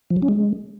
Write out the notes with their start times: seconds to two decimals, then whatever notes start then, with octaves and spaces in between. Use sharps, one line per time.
0.10 F3
0.16 F#3
0.22 C#4
0.28 G#3